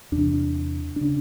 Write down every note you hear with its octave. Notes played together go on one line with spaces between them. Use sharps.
E2 C3 D4
C#3 D4